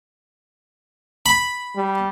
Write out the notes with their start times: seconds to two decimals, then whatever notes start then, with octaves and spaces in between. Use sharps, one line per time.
1.26 B5
1.76 G3